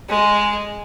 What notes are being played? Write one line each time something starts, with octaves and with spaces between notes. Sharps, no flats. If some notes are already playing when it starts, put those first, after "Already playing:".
G#3